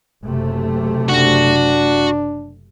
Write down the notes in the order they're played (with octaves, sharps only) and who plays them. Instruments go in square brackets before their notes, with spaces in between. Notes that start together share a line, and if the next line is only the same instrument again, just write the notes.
[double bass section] F#1 C3 A3
[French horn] D4 [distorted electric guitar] F#4